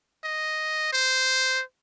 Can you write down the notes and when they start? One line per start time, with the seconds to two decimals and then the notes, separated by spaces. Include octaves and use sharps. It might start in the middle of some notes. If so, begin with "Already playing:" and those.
0.24 D#5
0.93 C5